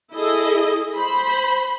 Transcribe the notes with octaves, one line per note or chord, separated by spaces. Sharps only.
E4 G#4 A4 D#5
C5 B5